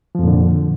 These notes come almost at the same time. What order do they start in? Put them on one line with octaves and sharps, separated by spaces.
F3 F2 A#2 D3